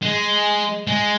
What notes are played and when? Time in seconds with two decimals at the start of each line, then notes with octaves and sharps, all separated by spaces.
0.02 G#3
0.88 G#3